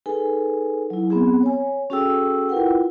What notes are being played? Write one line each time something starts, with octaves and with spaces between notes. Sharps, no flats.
D#4 G#4 A4 B4 G#5
F#3 E4
B3 C4 G#4
C#5 G#5
C#4 F#4 G#4 A4 G5 E6
E4 F4 A#4 B4 F#5 G5